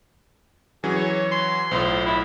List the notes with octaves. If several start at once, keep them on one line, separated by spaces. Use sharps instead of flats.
E3 F#3 C#4 G#4
C#5
C6
B1 A2 F4 C5
E4